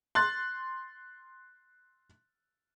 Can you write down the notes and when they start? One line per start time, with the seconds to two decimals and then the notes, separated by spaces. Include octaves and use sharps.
0.15 C6 F#6 A6